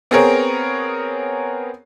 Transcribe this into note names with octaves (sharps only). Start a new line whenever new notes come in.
B3 C4 G#4 A#4 C#5